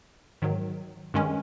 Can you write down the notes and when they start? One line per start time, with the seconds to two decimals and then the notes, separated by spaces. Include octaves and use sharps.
0.42 G#2 D#3 F#3
1.14 G2 D#3 G#3 C#4